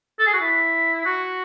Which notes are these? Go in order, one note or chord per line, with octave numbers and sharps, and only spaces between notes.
A4
G#4
F#4
E4
F#4